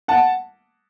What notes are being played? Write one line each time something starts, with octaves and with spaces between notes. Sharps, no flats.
F#5 A5